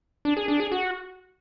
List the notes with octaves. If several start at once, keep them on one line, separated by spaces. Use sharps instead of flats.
D4
G#4
D4
G#4
F#4